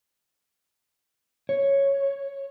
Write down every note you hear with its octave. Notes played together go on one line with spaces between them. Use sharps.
C#5